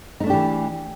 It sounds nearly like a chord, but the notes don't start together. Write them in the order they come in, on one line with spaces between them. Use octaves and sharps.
D#4 A3 D4 G4 E3